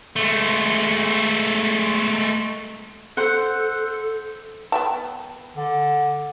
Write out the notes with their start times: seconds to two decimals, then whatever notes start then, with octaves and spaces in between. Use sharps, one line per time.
0.16 G#3 A3
3.17 A4 C5 F#5
4.72 B3 G5 A5
5.57 D3